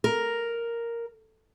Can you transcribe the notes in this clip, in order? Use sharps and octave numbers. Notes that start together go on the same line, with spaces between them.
A#4